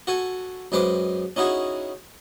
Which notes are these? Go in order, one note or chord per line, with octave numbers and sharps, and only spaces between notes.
F#4 A4 G#5
F#2 G#3 B4 C5 D6
C#4 D#4 E4 F#4 G#4